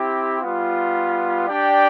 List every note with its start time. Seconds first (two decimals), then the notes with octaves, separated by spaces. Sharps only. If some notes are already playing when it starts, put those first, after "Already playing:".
Already playing: C4 E4 G4
0.42 G3 B3 F4
1.48 D4 G4 D5 G5